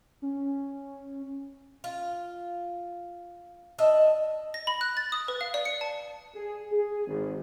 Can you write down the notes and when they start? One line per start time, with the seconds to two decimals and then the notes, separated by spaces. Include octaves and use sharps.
0.22 C#4
1.84 F4
3.78 D4 D#5 E5
4.54 A#6
4.67 B5
4.81 F#6
4.97 A6
5.12 D#6
5.28 B4
5.41 F5
5.54 D5
5.65 C#7
5.81 A5
6.34 G#4
6.71 G#4
7.06 G#1